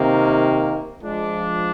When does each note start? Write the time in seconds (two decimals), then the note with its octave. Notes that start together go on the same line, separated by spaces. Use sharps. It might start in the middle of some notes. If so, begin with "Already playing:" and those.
Already playing: C3 D#3 A#3
1.01 F3 G#3 D4